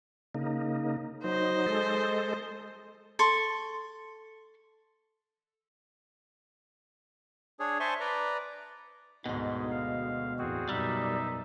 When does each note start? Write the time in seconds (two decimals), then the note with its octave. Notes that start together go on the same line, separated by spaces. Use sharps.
0.35 C#3 A#3 D#4
1.24 F#3 D#4 C5 D#5
1.66 G#3 A4
3.19 A4 C6 C#6
7.60 D4 G#4 C#5
7.80 C5 E5 G#5 A5 C6 C#6
8.00 B4 D5 A#5
9.26 D2 G#2 B2 G#3
9.71 F5
10.39 E2 A2 C4 F#4 G#4
10.69 F#2 B2 G3 D#4 E5